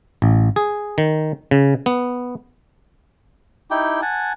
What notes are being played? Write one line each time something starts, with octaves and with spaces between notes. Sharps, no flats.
A1
G#4
D#3
C#3
B3
D#4 E4 G4 G5
F#5 G#5 A5